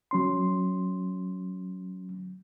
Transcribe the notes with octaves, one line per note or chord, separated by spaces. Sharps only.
F#3 C#4 C6